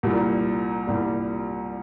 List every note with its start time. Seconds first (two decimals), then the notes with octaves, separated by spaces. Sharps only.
0.03 C2 A#2 G3
0.87 C2 A#2 G3